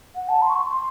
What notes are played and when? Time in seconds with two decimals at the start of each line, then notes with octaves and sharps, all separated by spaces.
0.15 F#5
0.28 A5
0.42 C6
0.49 C#6
0.55 C6
0.68 C6